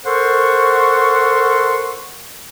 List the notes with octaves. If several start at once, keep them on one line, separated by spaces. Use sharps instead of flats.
A4 A#4 C5 F#5 C6 C#6